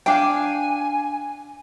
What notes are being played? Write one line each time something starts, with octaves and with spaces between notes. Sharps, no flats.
D4 F5 G5 G#5